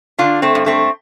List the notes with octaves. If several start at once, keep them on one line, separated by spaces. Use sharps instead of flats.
D3 D4 F4
A3 C4
G2
A3 C4